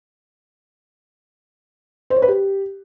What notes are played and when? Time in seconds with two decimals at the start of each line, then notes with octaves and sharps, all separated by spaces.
2.10 C5
2.16 C#5
2.22 B4
2.28 G4